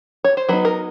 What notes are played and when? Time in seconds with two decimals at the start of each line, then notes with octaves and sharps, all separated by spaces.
0.24 C#5
0.37 C5
0.49 F#3 B3 D#4 B4
0.65 A#4